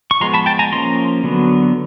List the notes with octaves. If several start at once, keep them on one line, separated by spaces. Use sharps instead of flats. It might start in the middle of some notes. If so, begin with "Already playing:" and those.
C#6
F3 G#3 B3 A#5 C6
A5 B5
G5 A5
G#5 A#5
F3 A#3 C#4 A#5 C6
D3 F#3 B3